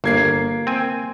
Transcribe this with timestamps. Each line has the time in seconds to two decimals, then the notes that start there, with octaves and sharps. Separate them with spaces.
0.04 G1 A#3 G#6 C7
0.67 C4 G#5